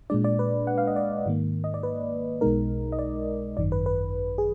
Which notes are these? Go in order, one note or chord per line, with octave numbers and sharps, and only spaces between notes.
A#2 G#3 D4 D5
D5
B4
F#5
F5
D#5
D5
G#2 D#3 A#3
D#5
D5
B4
B1 B2 G#3 D#4 A#4
D#5
D5
G#1 F#2 D#3 D5
B4
B4
G#4